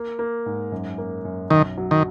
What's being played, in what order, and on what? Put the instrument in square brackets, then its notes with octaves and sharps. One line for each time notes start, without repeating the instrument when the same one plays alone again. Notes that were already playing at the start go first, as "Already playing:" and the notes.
Already playing: [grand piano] A#3
A#3
G#2
F#2
A#3
F#2
[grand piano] B1 [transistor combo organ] D#3
[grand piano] F#3
[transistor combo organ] D#3